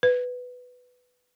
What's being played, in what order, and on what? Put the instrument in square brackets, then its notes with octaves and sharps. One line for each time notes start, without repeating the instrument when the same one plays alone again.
[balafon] B4